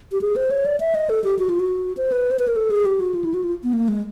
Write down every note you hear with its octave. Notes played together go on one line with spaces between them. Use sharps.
G4
G#4
C5
C#5
D5
E5
D#5
A4
G4
F#4
F4
F#4
C5
B4
C5
B4
A#4
A4
G#4
G4
F#4
F4
E4
F#4
F4
B3
A#3
G#3